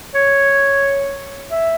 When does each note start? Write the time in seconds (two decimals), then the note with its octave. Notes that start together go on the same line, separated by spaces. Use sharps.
0.15 C#5
1.51 E5